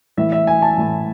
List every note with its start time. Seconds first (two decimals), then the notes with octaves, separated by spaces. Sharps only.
0.17 A2 E3 E5
0.32 E5
0.47 G#5
0.62 A5
0.78 A2 E3